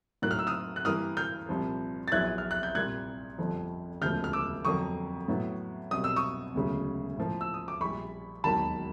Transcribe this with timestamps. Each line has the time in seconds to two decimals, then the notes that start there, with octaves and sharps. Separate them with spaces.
0.22 A2 F#3 A#3 D#4 F#6
0.31 F6
0.39 E6
0.47 D#6 F6
0.76 F#6
0.85 G2 E3 G3 A#3 D#6 F6
1.17 F6 G6
1.49 C2 A#2 F3
2.08 A6
2.12 A#1 A#2 F#3 B3 E4 F#6 G#6
2.38 F6
2.51 F#6
2.63 G6
2.75 C2 A#2 G3 A#3 F#6 G#6
3.38 G1 F2 D3 F3
4.01 E1 D2 C#3 F3 F6 G6
4.24 F6
4.33 D6 E6
4.65 F2 D3 F#3 A#3 C#6 D#6
5.28 A2 F#3 B3
5.91 C2 B2 F#3 D#6
6.04 E6
6.16 C#6 D#6
6.54 E1 D2 C#3 F#3
7.18 A2 F3 A#3
7.41 E6
7.54 D#6
7.68 D6
7.81 A#1 A#2 G3 B5 C#6
8.44 E1 D#2 D#3 F#3 A#3 A5 B5